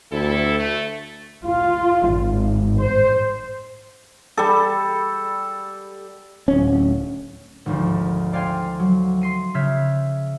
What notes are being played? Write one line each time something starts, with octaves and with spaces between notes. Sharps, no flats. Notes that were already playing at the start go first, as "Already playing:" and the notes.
D2 C3 E4 A4
A3
F4
G#1
C5
G3 A4
D1 C#4
G#1 D2 F3
C5 D5 F5 G5 G#5 C6
F#3
C6 C7 D#7
C#3 E5 F6 G6 G#6 B6